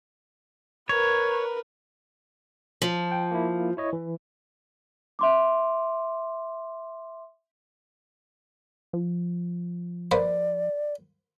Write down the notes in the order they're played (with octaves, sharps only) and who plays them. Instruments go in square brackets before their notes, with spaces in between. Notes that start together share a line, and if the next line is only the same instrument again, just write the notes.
[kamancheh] A#4 B4 [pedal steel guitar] C#5
[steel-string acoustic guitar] F3
[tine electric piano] G5
A#3 E4
E4 C#5 D#5
E3
[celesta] E5 C6 D6
[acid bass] F3
[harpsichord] A#3 B4 C5 [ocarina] D5